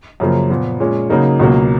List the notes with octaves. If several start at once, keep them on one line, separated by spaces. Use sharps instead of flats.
F#2 C#3 F3 A#3
A#2 F3 B3
A#2 G#3 C#4
C#3 F#3 A#3 D#4
C#2 B2 F#3 A#3